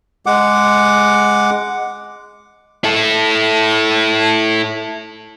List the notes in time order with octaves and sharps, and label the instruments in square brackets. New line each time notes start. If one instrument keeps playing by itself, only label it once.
[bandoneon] G#3 F#5 D6
[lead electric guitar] E4 A4